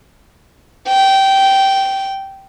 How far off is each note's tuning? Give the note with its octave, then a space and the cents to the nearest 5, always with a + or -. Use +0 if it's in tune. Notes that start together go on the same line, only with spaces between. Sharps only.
G5 -15